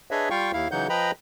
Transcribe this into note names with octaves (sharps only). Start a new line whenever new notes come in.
D4 G#4 B4 C#5 D#5 E5
G3 F4 F5 G5 C#6
D#2 E4 F5
C#3 E3 F#3 D#4 F#5 G6
F3 B4 D#5 G5 A#5 B5